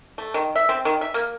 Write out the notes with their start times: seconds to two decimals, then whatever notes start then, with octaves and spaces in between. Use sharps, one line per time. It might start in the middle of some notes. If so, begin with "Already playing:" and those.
0.18 A3
0.34 D#3
0.56 E5
0.69 C4
0.85 D#3
1.01 E5
1.14 A#3